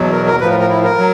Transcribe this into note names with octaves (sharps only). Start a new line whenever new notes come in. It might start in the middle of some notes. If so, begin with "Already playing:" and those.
Already playing: E2 B2 F#3
A#4
A#4
A2 F3 B4
A#4
A#4
E4
A#4
F#3